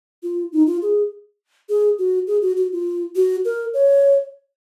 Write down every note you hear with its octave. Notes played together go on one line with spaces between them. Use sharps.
F4
D#4
F4
G#4
G#4
F#4
G#4
F#4
F#4
F4
F#4
A#4
C#5